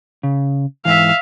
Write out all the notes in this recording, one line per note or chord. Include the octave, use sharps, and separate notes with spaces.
C#3
G#2 E3 E5 F5